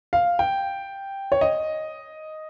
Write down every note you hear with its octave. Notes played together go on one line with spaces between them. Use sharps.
F5
G5
C#5
D#5